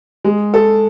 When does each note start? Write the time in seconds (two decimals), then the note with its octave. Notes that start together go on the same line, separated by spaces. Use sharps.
0.24 G#3
0.54 A4